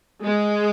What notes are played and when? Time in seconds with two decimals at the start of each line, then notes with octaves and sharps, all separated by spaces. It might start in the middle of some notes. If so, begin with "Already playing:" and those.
0.24 G#3